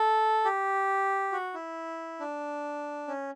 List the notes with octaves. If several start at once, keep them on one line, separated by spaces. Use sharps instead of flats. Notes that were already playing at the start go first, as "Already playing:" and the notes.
Already playing: A4
G4
F#4
E4
D4
C#4